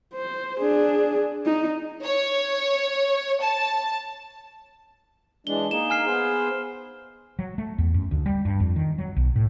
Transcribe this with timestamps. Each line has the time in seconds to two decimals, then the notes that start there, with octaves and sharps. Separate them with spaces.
0.14 C5
0.60 D4 G#4
1.46 D#4
2.04 C#5
3.43 A5
5.47 E3 G#3 D4 G7
5.71 A#3 D#4 G#4 E7
5.90 G#5 F6 C7
6.06 B3 G#4 C5
7.39 F#3
7.58 A3
7.78 E2
7.94 F#2
8.11 D2
8.26 G3
8.45 G2
8.60 F2
8.76 D#3
8.98 F#3
9.16 B1
9.36 A2